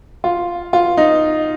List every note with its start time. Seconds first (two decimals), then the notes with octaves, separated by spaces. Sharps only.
0.24 F4
0.73 F4
0.97 D#4